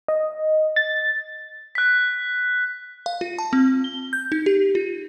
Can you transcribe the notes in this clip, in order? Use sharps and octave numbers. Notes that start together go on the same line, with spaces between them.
D#5
A6
F#6 B6
F5
F4
A5
C4
G7
G6
D#4
G4
F4